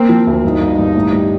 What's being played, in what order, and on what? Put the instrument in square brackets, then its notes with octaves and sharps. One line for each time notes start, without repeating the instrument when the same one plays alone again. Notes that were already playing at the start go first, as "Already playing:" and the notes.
Already playing: [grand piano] A#3 [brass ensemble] C4
[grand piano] F3
D2
[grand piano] G1 [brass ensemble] D#4
[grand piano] G1
G2
A2
G3